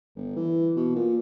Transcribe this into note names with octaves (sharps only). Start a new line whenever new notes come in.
G1
E3
B2
A#2